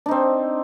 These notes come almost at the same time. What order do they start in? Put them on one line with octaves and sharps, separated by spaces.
D4 D#4 C4